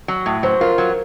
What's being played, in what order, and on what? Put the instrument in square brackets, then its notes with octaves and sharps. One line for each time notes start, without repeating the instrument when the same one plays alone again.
[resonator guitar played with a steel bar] F#3
A2
[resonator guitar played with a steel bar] F#3 [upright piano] C5
[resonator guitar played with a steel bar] F4 [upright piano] A#4
[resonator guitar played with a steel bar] F#3